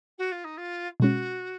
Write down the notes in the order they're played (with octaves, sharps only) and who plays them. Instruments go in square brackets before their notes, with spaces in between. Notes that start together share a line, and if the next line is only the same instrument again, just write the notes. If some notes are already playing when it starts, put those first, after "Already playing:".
[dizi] F#4
F4
D#4
F4
[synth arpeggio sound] B2 G#3 C#4 [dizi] F#4